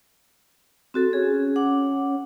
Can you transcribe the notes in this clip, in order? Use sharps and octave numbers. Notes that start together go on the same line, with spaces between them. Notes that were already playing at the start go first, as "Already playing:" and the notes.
C4 F#4 A4
C#4 G#4
F#5 D6